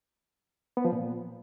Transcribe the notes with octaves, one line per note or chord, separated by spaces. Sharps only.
B3
F3
A#2